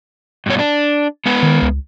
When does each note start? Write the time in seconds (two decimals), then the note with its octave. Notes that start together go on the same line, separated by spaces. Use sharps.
0.46 G2 B2 C#5
0.59 D4
1.26 G#3 B3 B4
1.43 D#3
1.62 C#2